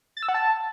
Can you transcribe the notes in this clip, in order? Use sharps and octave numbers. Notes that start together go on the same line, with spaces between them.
A6
E6
F#5
A5